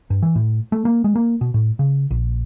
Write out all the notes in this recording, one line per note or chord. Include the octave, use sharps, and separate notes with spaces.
G2
E3
A2
A3
A#3
G#3
A#3
B2
A2
C#3
A#1